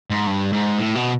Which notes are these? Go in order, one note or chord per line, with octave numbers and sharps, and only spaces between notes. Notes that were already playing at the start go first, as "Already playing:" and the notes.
G#2
G2
G#2
A2
B2